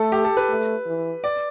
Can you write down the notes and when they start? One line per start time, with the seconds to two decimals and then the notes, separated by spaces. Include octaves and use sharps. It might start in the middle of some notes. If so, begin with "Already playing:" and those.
Already playing: A3 A4
0.12 G4
0.25 A4
0.37 B4
0.50 A3
0.87 E3
1.24 D5